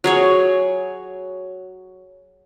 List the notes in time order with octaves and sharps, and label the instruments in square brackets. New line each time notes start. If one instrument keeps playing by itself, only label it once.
[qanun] F#3 G#4 C#5